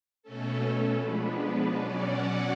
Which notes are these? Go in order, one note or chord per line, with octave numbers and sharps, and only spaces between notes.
B2 A3 C#4 A4
A4
F3 G#3 B3 D4 B4
B2 F#3 C#4 D5
F#5